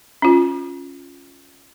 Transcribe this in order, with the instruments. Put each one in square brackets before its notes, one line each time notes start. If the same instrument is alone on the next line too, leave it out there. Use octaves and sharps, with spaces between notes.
[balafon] C#4 F4